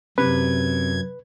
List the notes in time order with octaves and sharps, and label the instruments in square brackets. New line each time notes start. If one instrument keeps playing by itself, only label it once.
[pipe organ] F#2 G#6 [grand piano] C3 [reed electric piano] B4